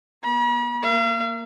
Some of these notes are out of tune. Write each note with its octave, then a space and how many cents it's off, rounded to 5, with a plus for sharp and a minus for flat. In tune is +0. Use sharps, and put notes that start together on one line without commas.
B3 -40 B5 -45
A#3 +0 F5 -40